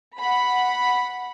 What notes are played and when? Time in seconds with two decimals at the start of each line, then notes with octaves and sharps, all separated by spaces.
0.18 F#5 B5